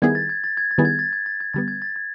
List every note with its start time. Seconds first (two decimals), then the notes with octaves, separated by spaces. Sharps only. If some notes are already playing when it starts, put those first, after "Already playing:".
0.02 D#3 G3 B3 E4 G#4 G#6
0.15 A6
0.29 G#6
0.44 A6
0.57 G#6
0.71 A6
0.78 D#3 G3 B3 E4 G#4
0.85 G#6
0.99 A6
1.13 G#6
1.26 A6
1.40 G#6
1.53 D3 G3 B3 A6
1.68 G#6
1.82 A6
1.96 G#6